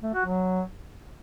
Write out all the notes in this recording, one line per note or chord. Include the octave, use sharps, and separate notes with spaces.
A3
F#4
F#3